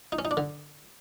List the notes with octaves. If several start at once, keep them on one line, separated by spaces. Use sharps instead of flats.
D#4
C#4
D#4
D4
D3